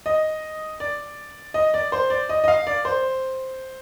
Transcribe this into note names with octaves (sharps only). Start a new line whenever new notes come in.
D#5
D5
D#5
D5
C5
D5
D#5
D#5
F5
D5
C5